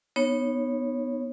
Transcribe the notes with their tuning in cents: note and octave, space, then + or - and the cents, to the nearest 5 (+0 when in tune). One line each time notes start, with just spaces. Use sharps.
B3 +0 D#4 -20 C#5 -15